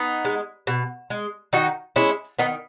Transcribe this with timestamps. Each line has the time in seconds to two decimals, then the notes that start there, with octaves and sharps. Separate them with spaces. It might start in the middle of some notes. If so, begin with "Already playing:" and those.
Already playing: B3 D#4
0.25 G#3
0.67 B2
1.10 G#3
1.53 D#3 D#4 F#4
1.96 G#3 C#4 E4
2.39 D#3 B3 D#4